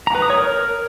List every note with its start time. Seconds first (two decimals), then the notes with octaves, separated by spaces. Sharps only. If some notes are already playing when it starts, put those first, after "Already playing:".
0.07 A#5
0.15 B4
0.22 D#6
0.30 C#5
0.37 A#4